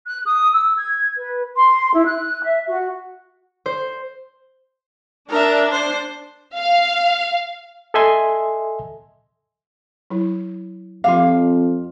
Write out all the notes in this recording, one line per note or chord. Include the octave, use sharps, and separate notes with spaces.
F#6
D#6
E6
G#6
B4
C6
E4
F#6
E5
F#4
C5
D4 A#4 E5
C5
F5
A4 D#5 E5 G#5 C6
F#3 E4
F2 F3 F4 G4 F5 D6